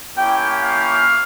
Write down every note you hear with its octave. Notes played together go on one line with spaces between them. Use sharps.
A#3 C#4 E4 G4 G5
F5